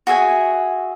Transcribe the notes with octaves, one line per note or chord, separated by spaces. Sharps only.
F#4 G#4 E5 G#5